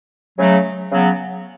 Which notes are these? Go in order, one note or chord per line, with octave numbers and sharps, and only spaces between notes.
C#3 F#3 A3
C#3 F#3 B3